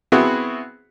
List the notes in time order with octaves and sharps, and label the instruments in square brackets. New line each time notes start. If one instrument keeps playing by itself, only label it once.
[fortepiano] B3 C4 E4 F#4 G#4